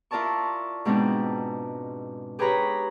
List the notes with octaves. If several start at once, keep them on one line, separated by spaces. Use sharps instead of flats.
E4 F4 A#4 D5 A5 C#6
G#2 B2 G#3 C4 D4 D#4
G4 G#4 B4 C#5 A#5 B5